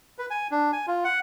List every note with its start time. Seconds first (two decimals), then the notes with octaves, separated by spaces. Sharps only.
0.18 B4
0.30 G#5
0.51 D4
0.73 G#5
0.87 F4
1.04 F#5